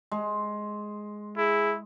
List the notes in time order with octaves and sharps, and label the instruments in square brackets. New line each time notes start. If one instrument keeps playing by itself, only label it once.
[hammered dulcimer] G#3
[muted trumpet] E4 [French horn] G#4